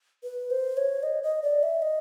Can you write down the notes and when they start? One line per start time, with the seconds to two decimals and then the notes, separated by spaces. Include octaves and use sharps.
0.24 B4
0.50 C5
0.77 C#5
1.03 D#5
1.23 D#5
1.43 D5
1.63 E5
1.82 D#5